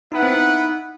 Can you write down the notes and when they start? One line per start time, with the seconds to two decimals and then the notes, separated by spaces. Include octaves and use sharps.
0.11 B3 D#4 E4 B4 F#5
0.23 C4
0.33 D#4